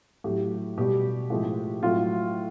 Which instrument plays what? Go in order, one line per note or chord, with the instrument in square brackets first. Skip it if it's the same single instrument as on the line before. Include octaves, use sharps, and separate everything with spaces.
[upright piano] A2 F#3 G4
B2 G3 G4
A2 F3 G#3
A2 F#3 F4